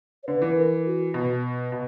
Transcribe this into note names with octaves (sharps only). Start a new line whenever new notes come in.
C#5
D3 B4
E3
A#4
F#4
B2
B2